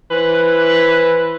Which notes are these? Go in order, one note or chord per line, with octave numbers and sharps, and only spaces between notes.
E3 B4 C5